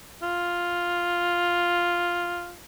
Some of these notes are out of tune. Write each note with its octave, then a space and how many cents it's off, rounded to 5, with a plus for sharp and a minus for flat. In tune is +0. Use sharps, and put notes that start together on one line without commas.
F4 +0